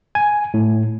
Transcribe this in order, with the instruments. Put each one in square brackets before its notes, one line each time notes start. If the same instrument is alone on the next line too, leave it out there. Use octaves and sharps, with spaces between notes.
[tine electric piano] G#5
A2